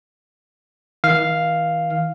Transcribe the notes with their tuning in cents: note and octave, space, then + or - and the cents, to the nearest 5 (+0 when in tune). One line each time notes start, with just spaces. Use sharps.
D#3 +45 F5 +0